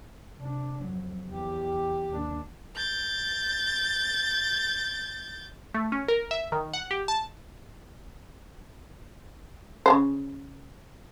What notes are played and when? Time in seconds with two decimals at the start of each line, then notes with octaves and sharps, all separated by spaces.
0.37 C3 D4
0.81 F2 F#3
1.30 E2 G4
2.13 D#2 D4
2.77 G6 A6
5.74 A3
5.92 C#4
6.08 A#4
6.31 E5
6.52 D#3
6.73 F#5
6.91 G4
7.08 A5
9.86 C#3 G#3 C5